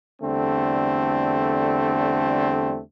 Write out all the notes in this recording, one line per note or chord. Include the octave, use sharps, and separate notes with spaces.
E2 D3 G3 A3 C4